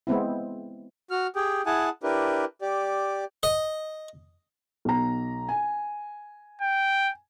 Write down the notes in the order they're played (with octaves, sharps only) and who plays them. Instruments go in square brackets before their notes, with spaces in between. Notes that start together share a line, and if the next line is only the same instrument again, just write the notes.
[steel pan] G#3 B3 C4 E4
[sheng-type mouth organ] F#4 F6
G4 G#4 G5
E4 G#4 F#5 G#5 A5
D4 E4 G4 A#4 B4
G4 D5
[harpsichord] D#5
[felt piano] B1 A#5
G#5
[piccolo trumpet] G5